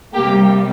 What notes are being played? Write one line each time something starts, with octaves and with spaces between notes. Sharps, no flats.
C3 G3 A#3 G4